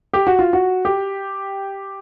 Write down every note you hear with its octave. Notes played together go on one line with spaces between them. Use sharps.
G4
F#4
F4
F#4
G4